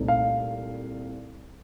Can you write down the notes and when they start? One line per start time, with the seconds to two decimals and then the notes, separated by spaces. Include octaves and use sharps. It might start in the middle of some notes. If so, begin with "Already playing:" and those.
Already playing: C2 A#2 A3 C4 D#4
0.08 F5